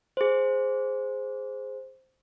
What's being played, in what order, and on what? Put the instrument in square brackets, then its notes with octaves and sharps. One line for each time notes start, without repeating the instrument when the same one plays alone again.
[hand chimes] G#4 C5